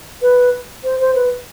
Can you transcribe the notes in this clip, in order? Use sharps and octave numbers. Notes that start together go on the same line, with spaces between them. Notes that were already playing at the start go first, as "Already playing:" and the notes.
B4
C5
C5
B4